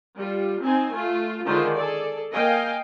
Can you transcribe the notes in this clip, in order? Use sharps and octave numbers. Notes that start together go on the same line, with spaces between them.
G3 F4
C4 D#4 G#5
A3 F4
D3 D#3 G#3 F4 C5
G#4 A4 D5
A#3 D#5 F5 G5 G#5